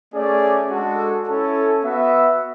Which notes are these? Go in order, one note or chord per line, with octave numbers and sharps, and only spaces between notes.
A3 C#4 G#4 D5
G#3 D4 F#4 A4
C#4 E4 A4
B3 F#4 B4 E5